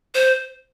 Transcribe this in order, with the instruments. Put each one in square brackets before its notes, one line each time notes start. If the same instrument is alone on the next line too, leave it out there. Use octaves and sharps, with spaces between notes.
[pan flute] C5